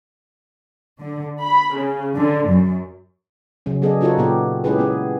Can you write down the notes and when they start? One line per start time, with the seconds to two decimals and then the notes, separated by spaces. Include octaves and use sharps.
1.02 D3
1.39 B5
1.79 C#3
2.15 D3
2.48 F#2
3.66 C#3 F#3 C#4
3.82 F#3 B3 G#4 A4 D5 D#5
4.01 C#4 D#4 F4 F#4 A4 C#5
4.18 A#2 A#3 B3 G4
4.64 G#3 C#4 E4 G4 G#4 B4
4.79 B3 C#4 G#4